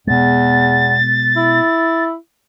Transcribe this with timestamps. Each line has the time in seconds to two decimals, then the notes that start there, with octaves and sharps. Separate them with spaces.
0.07 E2 B2 G#3 A6
1.37 E4